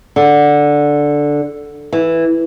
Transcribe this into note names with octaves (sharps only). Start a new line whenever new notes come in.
D3
E3